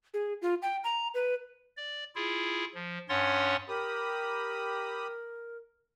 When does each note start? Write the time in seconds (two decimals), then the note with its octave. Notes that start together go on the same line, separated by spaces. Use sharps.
0.14 G#4
0.42 F4
0.62 G5
0.84 A#5
1.14 B4
1.77 D5
2.16 E4 F4 G#4
2.75 F3
3.09 G2 C#4 C#5 F#5 C6 A6
3.68 G4 A#4 B5 D#6